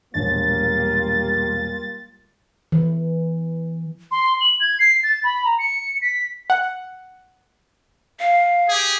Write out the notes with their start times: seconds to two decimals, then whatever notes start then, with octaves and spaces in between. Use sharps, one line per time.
0.14 E1 A#1 G3 A#3 F4 C#5 A6
2.72 E3
4.11 C6
4.41 F#7
4.60 G#6
4.79 C7
5.03 A6
5.24 B5
5.45 A#5
5.59 C#7
6.02 B6
6.50 F#5
8.20 F5
8.69 G4 G#4